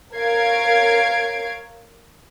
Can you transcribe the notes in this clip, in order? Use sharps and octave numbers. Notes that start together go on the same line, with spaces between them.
A#4 C#5 F5 G#6 C7 D7